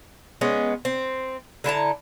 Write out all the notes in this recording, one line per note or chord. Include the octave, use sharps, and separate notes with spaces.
G#3 B3 C#4
C4
D3 E4 A5 A#5